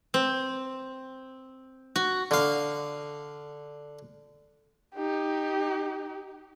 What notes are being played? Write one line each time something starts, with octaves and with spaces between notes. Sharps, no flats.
C4
F#4
D3 F5
D#4 G4